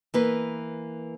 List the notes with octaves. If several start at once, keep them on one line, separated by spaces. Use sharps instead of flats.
E3 A#3 B4